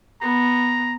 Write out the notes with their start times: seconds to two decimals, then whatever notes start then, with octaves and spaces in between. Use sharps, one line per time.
0.22 B3 A#5